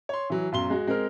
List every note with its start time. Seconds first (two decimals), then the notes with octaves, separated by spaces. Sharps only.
0.09 C#5 C6
0.30 E3 F#3
0.52 B1 F#2 C6 G7
0.70 G#3 F#4
0.87 G#3 C4 A#4 F6